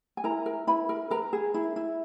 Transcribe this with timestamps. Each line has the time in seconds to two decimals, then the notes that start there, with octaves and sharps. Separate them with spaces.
0.17 G#5
0.24 E4 A#4 A#5
0.46 A#4
0.67 E4 B4 B5
0.89 A#4
1.11 A#4 B4 A#5
1.33 G#4
1.54 E4
1.76 E4